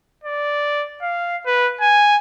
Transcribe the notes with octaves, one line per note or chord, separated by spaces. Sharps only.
D5
F5
B4
G#5